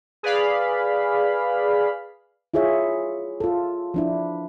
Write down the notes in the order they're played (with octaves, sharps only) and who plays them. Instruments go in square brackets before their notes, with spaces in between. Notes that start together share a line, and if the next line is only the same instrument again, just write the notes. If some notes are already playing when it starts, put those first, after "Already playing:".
[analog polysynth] G#4 B4 D5 F5 B5
[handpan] E4 F4 G#4 C#5 E5
F4 A4
F3 D4 E4